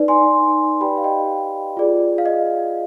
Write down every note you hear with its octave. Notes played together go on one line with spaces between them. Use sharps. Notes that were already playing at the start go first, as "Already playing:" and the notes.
Already playing: D#4 B4 D5
G#5 C6
G4 B4 D5 G5 B5
F5
D#5 G5
F4 G#4 D5
F5
D#5